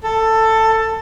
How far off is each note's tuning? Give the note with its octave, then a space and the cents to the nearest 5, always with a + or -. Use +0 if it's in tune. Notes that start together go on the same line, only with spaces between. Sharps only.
A4 +15